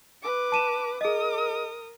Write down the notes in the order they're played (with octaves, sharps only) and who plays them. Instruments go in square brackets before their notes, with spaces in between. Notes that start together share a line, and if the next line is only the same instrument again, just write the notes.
[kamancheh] B4 D6
[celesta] A5 D#7 E7
[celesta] G#4 D#5 [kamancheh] A#4 D#6